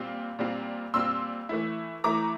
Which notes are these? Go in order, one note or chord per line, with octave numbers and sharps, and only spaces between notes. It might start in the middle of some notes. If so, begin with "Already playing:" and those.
Already playing: A#2 G3 C4 F4
A#2 G3 C4 F4
A#2 G3 C4 F4 C6 E6
E3 A3 E4
E3 A3 E4 A#5 D6